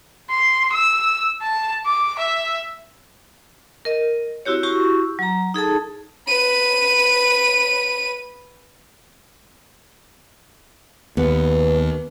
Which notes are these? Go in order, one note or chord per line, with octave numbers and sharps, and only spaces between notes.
C6
E6
A5
D6
E5
A#4 D#5
C4 E4 F#4 G4 C#5
E4 F#4 G4 C#6
F#3 A#5
D#4 G#4 A4 A5
B4 D#7
D#2 B3